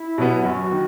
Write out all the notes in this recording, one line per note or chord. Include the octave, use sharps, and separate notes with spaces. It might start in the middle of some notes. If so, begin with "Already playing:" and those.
Already playing: E4
B2 F#3 B3
F#2 F#4
D#3